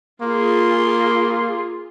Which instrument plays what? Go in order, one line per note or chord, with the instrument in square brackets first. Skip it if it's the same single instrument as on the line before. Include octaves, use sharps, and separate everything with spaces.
[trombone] A#3 [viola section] F4 G#4 [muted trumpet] C6